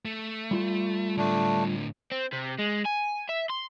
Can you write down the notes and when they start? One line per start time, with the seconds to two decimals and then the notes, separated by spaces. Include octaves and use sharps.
0.05 A3
0.51 G3 F4
1.17 A2 D3 A3 D4
2.11 C4
2.33 C3
2.59 G#3
2.86 G#5
3.29 E5
3.50 C6